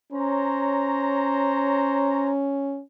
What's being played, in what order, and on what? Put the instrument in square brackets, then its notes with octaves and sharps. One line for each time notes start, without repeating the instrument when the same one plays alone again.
[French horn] C#4 [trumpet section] C5 C#5 A#5